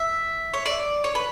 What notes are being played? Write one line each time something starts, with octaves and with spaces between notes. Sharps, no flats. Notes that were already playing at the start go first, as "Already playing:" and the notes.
Already playing: E5
C#5
D5
C#5
B4